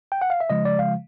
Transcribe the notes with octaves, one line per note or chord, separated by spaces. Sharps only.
G5
F#5
F5
E5
C#3 F3 G#3 D#5
D5
F5